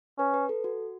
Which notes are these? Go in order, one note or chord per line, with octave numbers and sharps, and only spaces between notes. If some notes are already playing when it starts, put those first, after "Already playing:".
C#4 B4
B4
A4
F#4